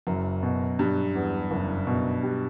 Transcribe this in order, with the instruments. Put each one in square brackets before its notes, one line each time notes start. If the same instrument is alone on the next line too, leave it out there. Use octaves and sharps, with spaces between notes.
[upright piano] F#1 [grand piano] F#2
[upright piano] B2
[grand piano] G2 [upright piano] G3
[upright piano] E2
F#1
B2
G3